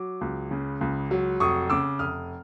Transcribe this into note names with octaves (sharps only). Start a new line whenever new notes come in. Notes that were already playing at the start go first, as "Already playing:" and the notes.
Already playing: F#3 D6
C#2
C#3
C#2
F#3
F1 C#6 D#6
C#3 D6 E6
F1 D#6 F6